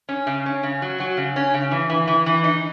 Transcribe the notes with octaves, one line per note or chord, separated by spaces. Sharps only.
C#4
C#3
C#4
C#3
F#3
F#3
C#3
C#4
C#3
E3
E3
E3
E3
D#4